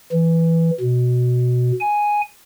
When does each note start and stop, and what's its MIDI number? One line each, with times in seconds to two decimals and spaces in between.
0.12 0.70 52
0.80 1.71 47
1.80 2.21 80